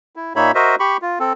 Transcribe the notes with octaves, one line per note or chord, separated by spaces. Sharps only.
E4
A#2 A#3 D#4 C#5 E5 B5
F#4 A#4 C5 D#5 E5
G4 B5 C#6
F4
C4 A4